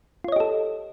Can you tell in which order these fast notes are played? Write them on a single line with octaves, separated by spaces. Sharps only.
F4 C#5 D#5 G4 A4